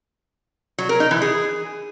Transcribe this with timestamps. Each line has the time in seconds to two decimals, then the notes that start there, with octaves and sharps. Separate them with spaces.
0.78 F#3
0.89 A#4
1.00 D#4
1.11 E3
1.22 G#4